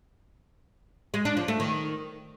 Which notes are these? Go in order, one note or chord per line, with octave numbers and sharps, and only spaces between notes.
G#3
D4
F3
A3
D#3